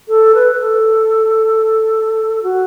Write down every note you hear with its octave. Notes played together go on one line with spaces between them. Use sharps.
A4
B4
B4
A4
F#4